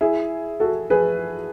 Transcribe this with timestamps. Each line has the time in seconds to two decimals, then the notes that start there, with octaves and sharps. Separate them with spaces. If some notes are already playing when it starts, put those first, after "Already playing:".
0.01 E4 G#4
0.60 F#4 A4
0.90 G#4 B4